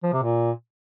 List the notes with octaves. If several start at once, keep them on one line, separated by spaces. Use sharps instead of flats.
F3
C3
A#2